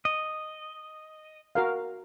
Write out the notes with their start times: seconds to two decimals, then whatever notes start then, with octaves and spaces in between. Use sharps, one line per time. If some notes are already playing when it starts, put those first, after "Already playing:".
0.05 D#5
1.55 F#4 A#4 F5